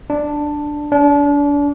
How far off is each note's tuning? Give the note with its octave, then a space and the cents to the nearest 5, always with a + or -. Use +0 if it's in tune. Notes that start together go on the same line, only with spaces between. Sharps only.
D4 +5
D4 -35